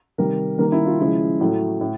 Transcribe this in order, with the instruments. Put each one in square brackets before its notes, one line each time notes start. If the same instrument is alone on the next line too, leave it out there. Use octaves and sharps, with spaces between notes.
[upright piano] C3 D#3 G3 A#4
D#3 G3 A#3 A#4
E4
F4
C#3 F3 G#3 E4
A2 F#3 A3
A2